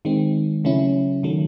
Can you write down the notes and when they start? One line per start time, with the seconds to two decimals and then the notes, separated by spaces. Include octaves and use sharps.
0.05 D#3 G#3 C4
0.64 C#3 F#3 A3 C#4 E4
1.23 D#3 F#3 A3